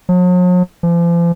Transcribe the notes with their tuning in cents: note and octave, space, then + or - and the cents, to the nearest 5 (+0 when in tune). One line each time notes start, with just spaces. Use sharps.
F#3 -45
F3 -40